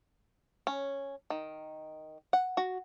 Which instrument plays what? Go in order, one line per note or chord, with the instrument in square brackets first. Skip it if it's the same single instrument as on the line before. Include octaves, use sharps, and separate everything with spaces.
[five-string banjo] C#4
D#3
F#5
F#4